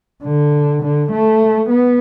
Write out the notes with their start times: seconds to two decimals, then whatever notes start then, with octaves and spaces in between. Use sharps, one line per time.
0.24 D3
0.82 D3
1.12 A3
1.70 B3